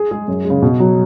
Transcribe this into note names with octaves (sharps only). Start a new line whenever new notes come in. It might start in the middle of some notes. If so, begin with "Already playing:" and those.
Already playing: G#4
G#3 G#4
F#2
G#3
C#3
B2
F#3